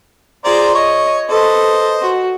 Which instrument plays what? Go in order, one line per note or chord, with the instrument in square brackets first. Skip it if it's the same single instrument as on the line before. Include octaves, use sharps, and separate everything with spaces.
[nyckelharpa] F4 G#4 [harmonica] C5 D5 A#5
[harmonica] C#5 [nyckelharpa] D#5
[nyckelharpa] A4 B4 [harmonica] C5 D#5
[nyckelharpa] F#4